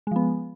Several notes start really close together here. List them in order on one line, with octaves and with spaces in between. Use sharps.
G#3 F3 B3